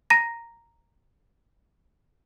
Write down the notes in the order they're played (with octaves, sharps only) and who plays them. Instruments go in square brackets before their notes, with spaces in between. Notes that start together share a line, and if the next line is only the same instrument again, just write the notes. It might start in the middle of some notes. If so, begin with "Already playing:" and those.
[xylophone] A#5 A#6